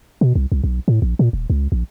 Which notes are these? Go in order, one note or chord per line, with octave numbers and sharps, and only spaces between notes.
B2
C2
C2
B1
A2
A#1
A#2
D#1
C#2
A#1